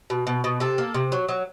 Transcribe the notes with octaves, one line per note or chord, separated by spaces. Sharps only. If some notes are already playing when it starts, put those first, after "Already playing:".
B2
B2
B2
C3 A4
A#3
C3
F#3
F#3